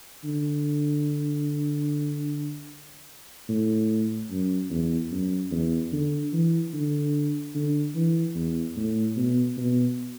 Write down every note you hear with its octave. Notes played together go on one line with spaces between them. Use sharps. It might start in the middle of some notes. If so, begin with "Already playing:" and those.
D3
A2
F#2
E2
F#2
E2
D3
E3
D3
D3
E3
E2
A2
B2
B2